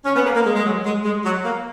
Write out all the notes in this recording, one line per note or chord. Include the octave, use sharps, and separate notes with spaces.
C#4
B3
A#3
A#3
G#3
G#3
F#3
G#3
G#3
F#3
A#3